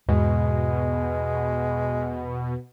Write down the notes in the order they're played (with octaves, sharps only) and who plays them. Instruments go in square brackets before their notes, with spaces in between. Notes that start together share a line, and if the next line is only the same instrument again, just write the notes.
[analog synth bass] E2 [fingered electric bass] G#2 [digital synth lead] B2 [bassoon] G#3